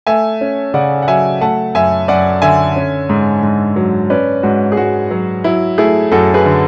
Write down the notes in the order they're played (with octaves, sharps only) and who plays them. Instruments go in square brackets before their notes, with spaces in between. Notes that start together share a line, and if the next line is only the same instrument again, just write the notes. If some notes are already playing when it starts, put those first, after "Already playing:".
[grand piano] A3 E5 G#5
C#4
C#3 D5 F#5
F#5
F#3 E5 G#5
A3 F#5 A5
F#2 E5 G#5
F#2 D5 F#5
D3 E5 G#5
C#4
G#2
G#2
F#3
C#4 B4 D5
G#2 F#4
G#4
G#2 F#4
F#3
F#3 E4
A3 E4 G#4
F#2 F#4 A4
G#4 B4
D3